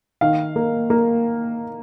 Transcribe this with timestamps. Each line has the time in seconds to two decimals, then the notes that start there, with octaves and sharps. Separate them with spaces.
0.21 D#3 F5
0.56 A#3
0.90 A#3